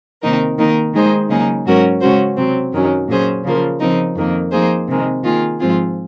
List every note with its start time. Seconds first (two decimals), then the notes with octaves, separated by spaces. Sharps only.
0.22 C3 D#3 A#3 D#4 A#4
0.58 D#3 A#3 D#4 A#4
0.93 D#3 G#3 D#4 G#4 C5
1.29 C#3 F#3 A#3 D#4 G#4
1.65 G#2 F#3 C#4 F#4 A#4
2.01 C#3 G#3 C#4 F#4 C5
2.37 C3 F#3 C4
2.72 F#2 D#3 F#3 C#4
3.08 A#2 F#3 C#4 G#4 C5
3.44 C#3 F3 A#3 F4
3.80 C#3 F3 C4 D#4 A#4
4.15 F2 D#3 A#3
4.51 F3 A#3 D#4 G#4 C5
4.88 C3 D#3 G#3
5.23 D#3 A#3 F4 G#4
5.59 G#2 F3 C4 F4 G#4